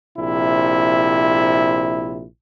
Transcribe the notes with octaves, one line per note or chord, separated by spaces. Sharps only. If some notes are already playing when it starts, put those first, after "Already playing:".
A#1 C3 E4